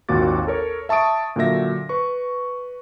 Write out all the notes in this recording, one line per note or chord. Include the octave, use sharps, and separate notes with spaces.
G#1 D#2 A#2 F#4 D6 A6
A4 A#4 C#5
E5 A5 C#6 D#6 D7
A#2 D3 F#3 A#3 E5 A#6
B4 C#6